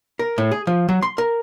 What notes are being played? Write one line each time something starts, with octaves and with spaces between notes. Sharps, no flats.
A#4
A2
G#4
F3
F#3
C6
A#4